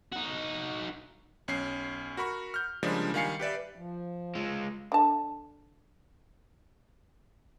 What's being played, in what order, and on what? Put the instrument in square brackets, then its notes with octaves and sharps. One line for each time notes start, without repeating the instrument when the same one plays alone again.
[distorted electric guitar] D#4 F#4
[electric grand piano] B1 C#4 C7
F#4 A#4 B5 C#6
F6 G6
C#3 F3 G3 G#3 A#3 D4
D#3 G3 F5 G#5 C7 C#7
G4 B4 D5 E5
[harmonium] F3
[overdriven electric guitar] G#3 F4
[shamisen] D3 A5